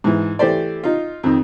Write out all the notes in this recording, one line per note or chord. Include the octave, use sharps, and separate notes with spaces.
G#2 E3
E3 A3 G4 C5 D5
D#4 F4
F2 D#3